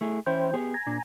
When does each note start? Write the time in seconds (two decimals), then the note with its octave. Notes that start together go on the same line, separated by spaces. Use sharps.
0.01 A3 E4 G#4
0.26 E3 C#4 E4 C5 G5
0.54 B3 G4 G#4
0.74 G#5 A#5
0.86 A#2 D4